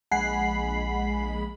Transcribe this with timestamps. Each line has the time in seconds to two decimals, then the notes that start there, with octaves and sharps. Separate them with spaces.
0.11 A#1 G#3 F#5 G#5 B5 C7